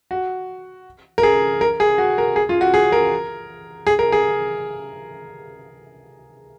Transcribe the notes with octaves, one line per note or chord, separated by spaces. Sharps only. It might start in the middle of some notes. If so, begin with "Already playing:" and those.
F#4
A#4
G#4
A#4
G#4
F#4
A#4
G#4
F4
F#4
G#4
A#4
G#4
A#4
G#4